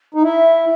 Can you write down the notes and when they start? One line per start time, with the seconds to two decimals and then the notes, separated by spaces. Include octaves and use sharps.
0.14 D#4
0.23 E4 E5